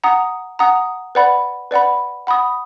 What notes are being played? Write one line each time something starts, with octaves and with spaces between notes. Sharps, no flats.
F#5 A#5 D#6
F#5 A#5 D#6
B4 D5 F#5 B5
B4 D5 F#5 B5
F#5 B5 D#6